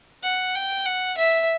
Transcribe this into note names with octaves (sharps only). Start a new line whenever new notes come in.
F#5
G5
F#5
E5